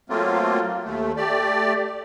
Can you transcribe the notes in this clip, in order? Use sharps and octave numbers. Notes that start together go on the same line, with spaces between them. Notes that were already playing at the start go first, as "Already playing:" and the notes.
F#3 A3 A#3 C4 F4
D#2 A3
A3 G4 D5